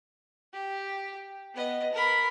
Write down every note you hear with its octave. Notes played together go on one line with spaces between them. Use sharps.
G4
B3 D#5
A#4 B5